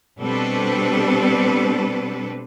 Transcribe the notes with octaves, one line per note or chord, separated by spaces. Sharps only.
B2 G3 C4 D4 A4 B4